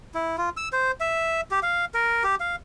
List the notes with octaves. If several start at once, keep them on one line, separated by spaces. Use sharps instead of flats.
E4
F4
E6
C5
E5
G4
F5
A#4
G4
F5